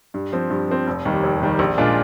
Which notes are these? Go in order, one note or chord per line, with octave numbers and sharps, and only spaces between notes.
G2
F3 C4
G2
F3 C4
F1
D#2 D#3 G3
F1
D#2 D#3 G3
A#1
A#2 G#3 D4 F4